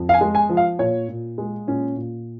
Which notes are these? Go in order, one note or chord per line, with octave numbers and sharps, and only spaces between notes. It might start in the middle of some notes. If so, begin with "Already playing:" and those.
Already playing: F2
F5
G#5
G#3
G#5
F3
F5
A#2 C#5
A#2
G#3
A#2 C#4
A#2